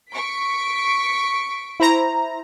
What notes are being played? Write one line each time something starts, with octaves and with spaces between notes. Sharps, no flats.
C#6 B6 D7
E4 C5 A#5